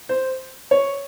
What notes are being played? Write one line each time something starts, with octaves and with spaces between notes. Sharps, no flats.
C5
C#5